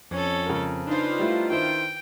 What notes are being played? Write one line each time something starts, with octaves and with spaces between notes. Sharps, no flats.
F2 C#4 A4
C#3 A#4
D4 D#4 F4 B4 C5
G3 A3 E4
D#3 E4 C5 G5